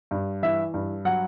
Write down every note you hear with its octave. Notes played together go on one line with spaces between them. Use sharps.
G2
E3 E5
G2
F#3 F#5